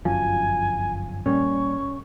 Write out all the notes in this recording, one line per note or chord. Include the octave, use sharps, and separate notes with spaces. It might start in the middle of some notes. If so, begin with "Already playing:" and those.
G1 F#2 F3 G#5
A#2 G3 C#4 C#6